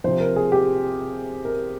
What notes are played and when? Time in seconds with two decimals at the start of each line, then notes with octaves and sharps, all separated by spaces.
0.04 C3 F3 C5
0.20 A#4
0.36 G#4
0.52 G4
1.45 A#4